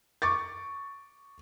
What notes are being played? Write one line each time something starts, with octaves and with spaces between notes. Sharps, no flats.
C#6 D6 A6